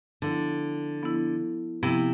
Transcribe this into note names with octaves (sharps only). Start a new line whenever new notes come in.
D3 F3 B3 E4
F3 B3 E4
C3 F3 B3 E4